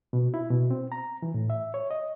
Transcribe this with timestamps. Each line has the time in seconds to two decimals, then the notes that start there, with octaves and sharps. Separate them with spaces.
0.13 B2
0.34 E4
0.50 B2
0.71 C4
0.92 A#5
1.22 E3
1.34 A2
1.50 E5
1.74 C#5
1.91 D#5